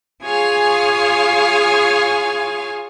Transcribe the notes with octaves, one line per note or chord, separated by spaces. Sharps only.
F4 G#4 C#5 F5 G#5